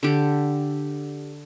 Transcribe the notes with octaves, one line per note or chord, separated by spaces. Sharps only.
D3 G4